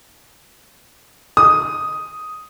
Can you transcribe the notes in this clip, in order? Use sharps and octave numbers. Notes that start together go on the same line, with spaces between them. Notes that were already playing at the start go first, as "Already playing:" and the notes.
D#6